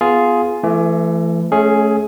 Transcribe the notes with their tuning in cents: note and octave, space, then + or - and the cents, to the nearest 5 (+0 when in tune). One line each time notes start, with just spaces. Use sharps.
B3 +0 F4 +0 G#4 +10
E3 +35 A3 +0
A3 -25 C#4 +0 G#4 +10